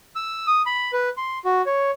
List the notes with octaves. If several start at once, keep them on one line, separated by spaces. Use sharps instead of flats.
E6
D#6
B5
B4
C6
F#4
C#5